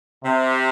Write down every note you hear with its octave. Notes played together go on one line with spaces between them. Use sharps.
C3